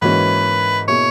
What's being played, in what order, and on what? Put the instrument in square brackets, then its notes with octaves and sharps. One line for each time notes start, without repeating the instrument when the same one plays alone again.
[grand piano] G#2 E3 A#3 C#4 F#4 [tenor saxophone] B4
[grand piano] B2 A#3 E4 G#4 [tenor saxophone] C#5